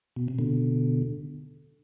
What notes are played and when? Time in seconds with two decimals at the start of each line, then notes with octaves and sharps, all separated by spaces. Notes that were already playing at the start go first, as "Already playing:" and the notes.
0.16 B2
0.28 C3
0.39 B2 D3